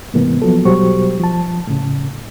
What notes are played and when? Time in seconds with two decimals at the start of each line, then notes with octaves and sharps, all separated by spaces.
0.14 G#2 C3 E3 A#3 B3
0.42 F3 F#3 B3 A4
0.65 B2 F#3 G3 G4 C5 C#6
1.20 F3 A5
1.67 A2 C#3